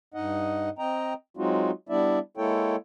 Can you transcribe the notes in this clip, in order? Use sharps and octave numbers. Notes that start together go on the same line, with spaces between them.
G2 D#4 D#5 F#5
C4 D#5 G5 A#5
F#3 G#3 C4 D#4 F4 F#4
G3 B3 D4 E4 D5 E5
G#3 A#3 E4 A4 C#5 G5